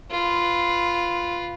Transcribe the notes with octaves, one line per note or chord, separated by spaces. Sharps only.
F4 B4